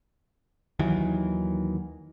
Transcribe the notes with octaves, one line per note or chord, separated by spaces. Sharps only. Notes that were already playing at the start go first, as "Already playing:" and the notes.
D#2 D#3 E3 F#3